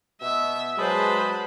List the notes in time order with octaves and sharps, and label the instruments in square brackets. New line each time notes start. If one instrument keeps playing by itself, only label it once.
[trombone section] B2 [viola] E5
[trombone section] F#3 [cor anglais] G#3 [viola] G#4 B4 [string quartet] C5 A5 B5